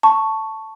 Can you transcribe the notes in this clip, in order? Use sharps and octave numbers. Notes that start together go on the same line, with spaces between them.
A5 C#6